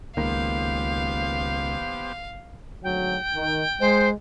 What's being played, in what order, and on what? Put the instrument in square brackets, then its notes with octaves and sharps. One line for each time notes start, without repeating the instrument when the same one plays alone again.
[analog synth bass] C#2 [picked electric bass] D#3 A#3 [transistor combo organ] B3 G4 C5 [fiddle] F5
[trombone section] G#1 D2 F#3 [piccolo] G5
[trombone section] D#3
[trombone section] G#3 [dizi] C5